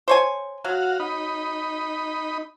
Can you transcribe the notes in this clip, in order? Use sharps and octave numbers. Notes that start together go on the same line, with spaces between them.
C5 C#5 G#5
F#3 F#4 F5
D#4 B5